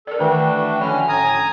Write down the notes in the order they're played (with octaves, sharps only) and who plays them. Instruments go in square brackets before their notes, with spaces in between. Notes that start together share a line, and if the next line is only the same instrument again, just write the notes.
[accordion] A4 [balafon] A#4 D5
[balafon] D#3 B4 [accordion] E3 A3 D4 [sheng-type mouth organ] F#4 [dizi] G5
[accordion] D3 C#4 F6 [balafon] F3 B5
[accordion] A2 [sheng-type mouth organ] G#5 A#5 D#6